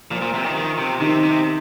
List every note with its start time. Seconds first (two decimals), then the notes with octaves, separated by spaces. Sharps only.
0.11 A#2 F3 F4
0.22 A#2
0.34 C3
0.45 D#3
0.55 D#3
0.78 C3
1.00 C3 D#3 D#4
1.23 C3